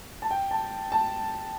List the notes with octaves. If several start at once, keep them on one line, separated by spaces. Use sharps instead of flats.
A5
G5
A5
A5